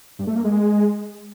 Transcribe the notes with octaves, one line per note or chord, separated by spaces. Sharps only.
G2
A3
A#3
G#3